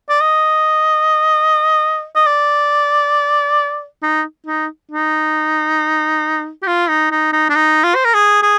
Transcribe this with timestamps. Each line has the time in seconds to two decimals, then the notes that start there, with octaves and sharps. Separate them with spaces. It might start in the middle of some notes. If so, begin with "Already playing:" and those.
0.10 D5
0.21 D#5
2.16 D#5
2.27 D5
4.03 D#4
4.47 D#4
4.92 D#4
6.63 G4
6.67 F4
6.89 D#4
7.11 D#4
7.33 D#4
7.50 D4
7.55 D#4
7.84 F4
7.95 C5
8.05 A#4
8.14 G#4
8.43 G#4